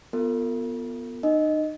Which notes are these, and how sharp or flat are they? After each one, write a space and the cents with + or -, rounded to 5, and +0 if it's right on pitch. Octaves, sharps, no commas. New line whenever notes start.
B3 +0 F4 +0 A4 +45
D#4 -35 D#5 +0